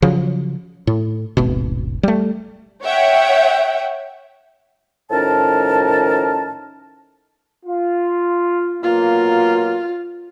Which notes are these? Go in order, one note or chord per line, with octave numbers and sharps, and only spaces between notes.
C#3 F3 F#3
A2
D#1 G#1 B2
G3 A3
C#5 E5 F#5 G5
A2 D#3 F3 C#4 A#4 A5
F4
B2 F#3 A#3 F4